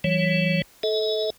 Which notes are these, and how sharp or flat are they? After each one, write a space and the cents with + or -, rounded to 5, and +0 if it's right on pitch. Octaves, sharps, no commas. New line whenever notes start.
E3 +10 G3 -40 C#5 +0
A4 -20 D#5 +45